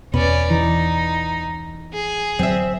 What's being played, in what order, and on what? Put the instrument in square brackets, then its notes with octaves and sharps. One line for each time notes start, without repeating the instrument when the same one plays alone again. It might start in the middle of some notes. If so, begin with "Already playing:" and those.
[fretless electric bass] E2 B2 B3 [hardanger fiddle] C#4 D5 [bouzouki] B4
[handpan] E3 [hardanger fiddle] D#4
[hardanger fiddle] G#4
[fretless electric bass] D1 F#3 [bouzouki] C4 E5